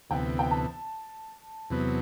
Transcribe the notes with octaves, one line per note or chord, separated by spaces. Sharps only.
D2 C3 E3 B3 G5
G5
A5
E2 C3 F#3 B3